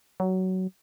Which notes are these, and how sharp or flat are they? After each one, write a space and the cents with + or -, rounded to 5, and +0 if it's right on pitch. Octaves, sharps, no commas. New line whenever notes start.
F#3 +15